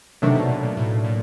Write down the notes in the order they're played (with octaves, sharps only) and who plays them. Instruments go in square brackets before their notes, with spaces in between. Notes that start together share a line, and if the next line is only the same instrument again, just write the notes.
[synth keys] C3 [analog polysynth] D#3 F#3 A3 D4
[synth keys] B2
A#2
A#2
A2
A#2